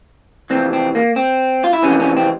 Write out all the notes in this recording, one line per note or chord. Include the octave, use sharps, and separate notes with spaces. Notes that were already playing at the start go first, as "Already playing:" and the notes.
F2 C3 E3 C4
C4
A#3
C4
F4
E4
F2 C3 E3 C#4
C#4
C4